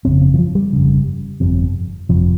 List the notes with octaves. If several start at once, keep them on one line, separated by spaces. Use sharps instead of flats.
G1 F2 C#3 C4
C4
E3
F3
G3
G1 F2 C#3
G1 F2 C3
G1 F2 C3 F3